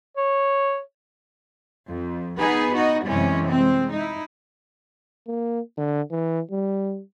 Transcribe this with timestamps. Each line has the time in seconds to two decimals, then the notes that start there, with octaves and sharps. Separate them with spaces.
0.17 C#5
1.88 F2
2.39 B3 D#4 G#4 B4
2.74 D#4 F#4 D#5
3.06 F#2 C3 E3 G3 G#3 C#4
3.50 G#3 C4
3.93 D#4 E4
5.27 A#3
5.77 D3
6.11 E3
6.51 G3